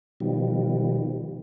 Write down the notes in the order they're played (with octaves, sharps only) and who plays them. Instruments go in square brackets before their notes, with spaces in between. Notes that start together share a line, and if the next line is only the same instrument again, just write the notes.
[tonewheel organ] B2 D#3 F3 G3